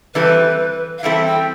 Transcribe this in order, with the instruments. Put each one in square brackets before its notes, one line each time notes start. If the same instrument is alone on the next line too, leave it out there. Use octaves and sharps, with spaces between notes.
[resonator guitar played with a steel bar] E3 G3 C4 E4 A4 [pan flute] B4
[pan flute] F5
[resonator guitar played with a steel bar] E3 G3 C4 E4 A4 [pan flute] E5
[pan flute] G5